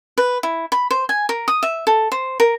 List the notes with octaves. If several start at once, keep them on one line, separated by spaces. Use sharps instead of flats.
B4
E4
B5
C5
G#5
A#4
D#6
E5
A4
C5
A#4